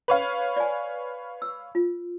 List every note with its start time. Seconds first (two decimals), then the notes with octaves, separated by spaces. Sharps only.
0.08 B4 C#5 F5
0.56 D5 G#5
1.42 E6
1.75 F4